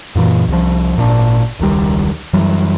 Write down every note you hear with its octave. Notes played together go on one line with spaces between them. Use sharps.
F#2 A#2 C#3 E3
C2 F3
G#1 A#2 D#3 D4
E1 C#2 D#3 G3
F#2 E3 F#3 G3